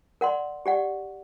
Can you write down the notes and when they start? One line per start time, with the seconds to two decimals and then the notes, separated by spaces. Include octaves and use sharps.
0.21 A#4 D5 F#5 C6
0.66 G4 D5 F#5